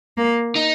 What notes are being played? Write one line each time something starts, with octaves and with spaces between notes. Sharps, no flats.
A#3
D#4